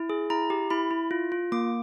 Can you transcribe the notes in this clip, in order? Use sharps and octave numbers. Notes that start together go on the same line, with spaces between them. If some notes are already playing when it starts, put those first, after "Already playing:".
Already playing: E4
G#4
E4 A#5
G4
E4 B5
E4
F4
F4
A#3 D6